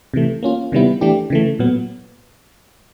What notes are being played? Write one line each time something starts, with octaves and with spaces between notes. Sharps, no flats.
C3 E3 A3
A#3 C#4 F4
C3 D#3 G3 B3 E4
E3 A3 D4 G4
C#3 E3 A3
A#2 F#3 B3